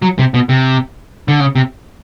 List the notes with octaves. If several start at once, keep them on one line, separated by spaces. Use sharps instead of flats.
F#3
C3
B2
C3
D3
C#3
C3